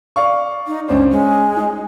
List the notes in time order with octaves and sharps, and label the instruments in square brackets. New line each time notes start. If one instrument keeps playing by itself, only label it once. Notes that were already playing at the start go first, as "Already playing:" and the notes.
[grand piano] D5 F5 C#6
[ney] D#4
[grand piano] C#2 D4 C5 [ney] C#4
[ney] G#3 [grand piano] C#4
[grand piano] D#4